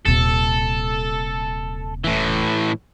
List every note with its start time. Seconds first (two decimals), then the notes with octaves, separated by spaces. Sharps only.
0.06 D#1 C3 A4
2.04 A2 E3